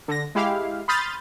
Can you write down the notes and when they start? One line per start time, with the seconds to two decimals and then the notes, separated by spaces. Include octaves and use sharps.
0.08 D3 A#6
0.35 G#3 E4 G4 F5
0.88 B5 C6 D#6 F6 G6 A6